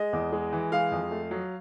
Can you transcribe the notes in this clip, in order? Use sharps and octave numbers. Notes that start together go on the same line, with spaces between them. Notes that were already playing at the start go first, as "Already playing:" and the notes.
Already playing: G#3 D#5
E2
G#3
E3
G#3 F5
F2
A3
F#3